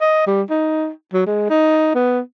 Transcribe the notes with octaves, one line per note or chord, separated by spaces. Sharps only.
D#5
G3
D#4
F#3
G#3
D#4
B3